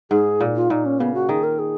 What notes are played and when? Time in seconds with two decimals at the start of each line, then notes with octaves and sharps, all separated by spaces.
0.11 G#2 G#4
0.40 A#2
0.55 F4
0.70 A#2 D#4
0.85 C#4
1.00 C#3 B3
1.14 F#4
1.29 D#3 G#4
1.44 A#4
1.59 G#4